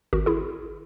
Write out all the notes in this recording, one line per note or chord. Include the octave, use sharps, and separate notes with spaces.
G#1 F#4 A#4
E4 G#4